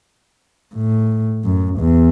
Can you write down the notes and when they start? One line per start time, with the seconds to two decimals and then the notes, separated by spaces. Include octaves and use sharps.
0.75 A2
1.44 F#2
1.79 E2